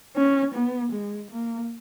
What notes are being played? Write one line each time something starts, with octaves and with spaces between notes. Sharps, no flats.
C#4
B3
G#3
A#3